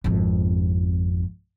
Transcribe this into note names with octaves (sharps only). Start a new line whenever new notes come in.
G#1 F2